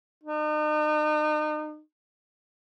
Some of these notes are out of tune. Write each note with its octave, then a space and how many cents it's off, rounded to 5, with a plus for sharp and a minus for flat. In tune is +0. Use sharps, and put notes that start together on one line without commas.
D#4 -40